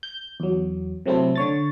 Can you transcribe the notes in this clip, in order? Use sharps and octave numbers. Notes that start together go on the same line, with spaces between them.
G6
E2 F#3
C3 F#3 A3 C4 E4 A4
D3 C#5 A6